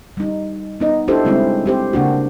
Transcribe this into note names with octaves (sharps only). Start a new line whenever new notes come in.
G3 D#4
B3 D#4 D#5
D4 E4 G4 A4 C5
G3 G#3 C4 C#4 E4
C4 G4 C5
C#3 A#3 D4 F#4